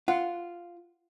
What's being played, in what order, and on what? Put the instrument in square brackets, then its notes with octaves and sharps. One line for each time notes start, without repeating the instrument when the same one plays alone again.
[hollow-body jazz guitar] F4 [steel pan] F#5